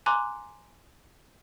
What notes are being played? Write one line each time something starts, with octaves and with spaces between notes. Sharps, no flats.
G#5 A#5 C6 D6 F#6